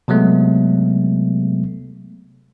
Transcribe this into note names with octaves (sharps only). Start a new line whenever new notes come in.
C3 F#3 G#3 A3 B3